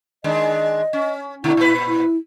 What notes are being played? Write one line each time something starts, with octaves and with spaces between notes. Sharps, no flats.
D#3 G#3 D4 D#5
C#4
B2 D3 A3 E4
A#2 B4
E4